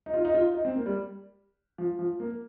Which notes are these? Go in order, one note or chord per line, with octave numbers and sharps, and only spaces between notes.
D#4
F4
D#4
F4
D#4
C4
A#3
G3
F3
F3
A#3